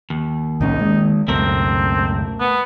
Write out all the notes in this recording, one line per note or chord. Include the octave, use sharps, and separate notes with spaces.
D#2
C2 A2 C#4 D#4
D#3 G#3
C#2 F#2 B2 A3 C4 A#4
B3